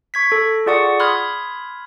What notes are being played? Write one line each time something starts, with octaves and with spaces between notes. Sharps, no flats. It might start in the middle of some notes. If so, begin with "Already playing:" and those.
C#6 G#6 B6
A4
F4 G#4 D5 F#5 C#6 D#6
B5 C6 D#6 F6 F#6 G#6